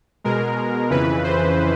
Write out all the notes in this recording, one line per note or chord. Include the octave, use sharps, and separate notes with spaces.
B2 G#3 A#4
F2 C#3 E3 B4
C5